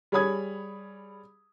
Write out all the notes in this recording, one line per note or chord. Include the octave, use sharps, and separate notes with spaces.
G3 G#4 C#5 B5 D#6 G#6